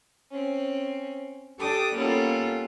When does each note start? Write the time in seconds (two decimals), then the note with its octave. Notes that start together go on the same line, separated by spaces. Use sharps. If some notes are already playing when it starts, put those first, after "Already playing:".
0.30 C4 C#4
1.58 D4 G4 A4 D6 D#6
1.94 G3 A#3 B3 C#4 F4 A4